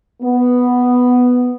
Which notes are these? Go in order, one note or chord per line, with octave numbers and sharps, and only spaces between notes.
B3